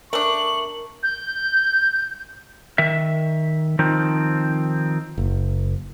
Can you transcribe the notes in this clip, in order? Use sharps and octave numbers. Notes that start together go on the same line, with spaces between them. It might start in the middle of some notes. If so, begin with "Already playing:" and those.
A3 D4 A#4 C#6 F#7
G6
D#3 E5
D#3 F3 C4 D#4
F#1